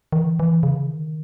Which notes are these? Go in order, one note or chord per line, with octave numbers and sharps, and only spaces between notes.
D#3
E3
E3
C#3
D#3